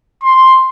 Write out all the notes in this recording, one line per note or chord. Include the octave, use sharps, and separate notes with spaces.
C6